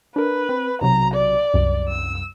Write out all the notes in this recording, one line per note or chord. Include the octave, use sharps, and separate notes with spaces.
D4 A#4 B4
C4
B1 C3 F#3 A#5
D5
C2 F#2
E6